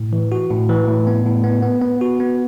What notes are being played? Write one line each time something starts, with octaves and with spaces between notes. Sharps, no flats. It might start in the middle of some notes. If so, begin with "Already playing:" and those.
Already playing: A2
E3
F#4
A2
E3
A2
B3
A2
B3
B3
B3
F#4
B3